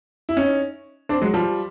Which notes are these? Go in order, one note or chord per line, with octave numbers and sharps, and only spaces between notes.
E4
C#4 D#4
C4 D4
F#3 G#3
F3 G3